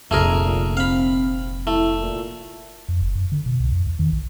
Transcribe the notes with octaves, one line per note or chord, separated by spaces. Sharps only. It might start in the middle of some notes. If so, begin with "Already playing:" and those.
F1 A#1 F2 A3 G#4 A#4
A#2
C4 F5 B5
A3 E4
A#2
F2
F#1
F#2
D3
B2
C2
F2
E2
D#3
A#1